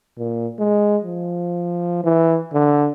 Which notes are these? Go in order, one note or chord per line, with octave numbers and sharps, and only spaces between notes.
A#2
G#3
F3
E3
D3